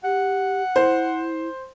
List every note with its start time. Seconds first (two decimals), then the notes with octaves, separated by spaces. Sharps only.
0.04 G4 F#5
0.76 E4 C5